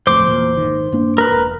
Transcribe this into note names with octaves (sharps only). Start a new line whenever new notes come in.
D1 F2 A3 C5 D6
E2 A#2
G#1 D#3
G2 A#3 D4
A#4 B4
E1